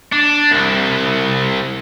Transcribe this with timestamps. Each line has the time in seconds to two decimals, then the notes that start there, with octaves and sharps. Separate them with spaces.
0.12 D4
0.52 C2